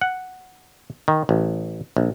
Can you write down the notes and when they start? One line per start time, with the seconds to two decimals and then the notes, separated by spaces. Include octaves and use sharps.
0.01 F#5
1.08 D#3
1.29 A1
1.97 A#1